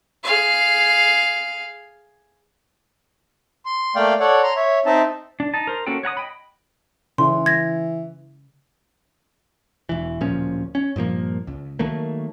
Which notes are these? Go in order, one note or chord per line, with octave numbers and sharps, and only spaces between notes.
G#4 F5
C6
A3 A#3 D5 F5 G5
A4 C#5 D5 F#5
A#5 C6
C#5 E5
C4 D#4 D#5 E5 A5
D4
D#4 A5
A#4 C5
A#3 C#4 F#4 A4 G5
C#5 F#5 A#5 D#6
D#5 G5 B5
C#3 E3 C6
G#6 A#6
E1 E3
D1 A#2 F3 C#4
C#4
G2 A#2 F3 A#3
C#2
D#3 F#3 A3 A#3